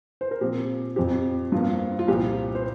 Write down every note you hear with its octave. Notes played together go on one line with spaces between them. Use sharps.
C5
A#4
A#2 F3 C4 G4
F2 F3 C4 G4
G2 F3 A#3 F4
F4
C2 A#2 F3 G4
C5